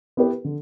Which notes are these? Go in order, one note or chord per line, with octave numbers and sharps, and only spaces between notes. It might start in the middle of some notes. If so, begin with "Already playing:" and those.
B3 E4 G4 B4
D3